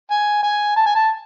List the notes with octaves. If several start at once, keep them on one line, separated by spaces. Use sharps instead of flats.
G#5
G#5
A5
G#5
A5